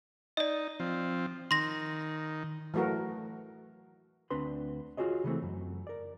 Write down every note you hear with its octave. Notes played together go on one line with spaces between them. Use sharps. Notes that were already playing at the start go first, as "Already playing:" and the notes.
D#4 D5 D#5
F3 C4
D#3 C6 A#6
E3 F#3 A3 F#4 A#4
D2 C4 D4 B4 C6
F4 F#4 G#4 C#5 D#5
C#3 E3 A3 C4
F#2
A#4 D5